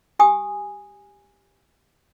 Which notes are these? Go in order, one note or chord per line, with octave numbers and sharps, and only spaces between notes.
G4 G#5 D#6